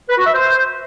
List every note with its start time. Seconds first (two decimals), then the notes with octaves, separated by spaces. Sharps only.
0.09 B4
0.18 F#4
0.26 E5
0.34 C5